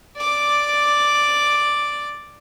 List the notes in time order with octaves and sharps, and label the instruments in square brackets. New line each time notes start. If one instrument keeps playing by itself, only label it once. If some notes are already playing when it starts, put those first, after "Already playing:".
[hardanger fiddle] D5 D6